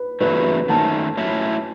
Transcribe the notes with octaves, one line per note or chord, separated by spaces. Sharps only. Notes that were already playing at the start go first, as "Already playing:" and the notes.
Already playing: B4
E2 C#3 F#3 A3 B4
D#3 A3 C#4 A5
A2 F#3 C#4 E4